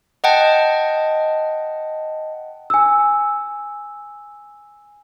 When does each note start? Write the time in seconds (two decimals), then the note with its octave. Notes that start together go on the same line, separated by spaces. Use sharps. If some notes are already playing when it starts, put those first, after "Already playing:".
0.24 D#5 F#5 G5 A5
2.70 G#5 E6